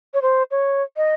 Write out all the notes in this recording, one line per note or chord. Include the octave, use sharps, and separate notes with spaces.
C#5
C5
C#5
D#5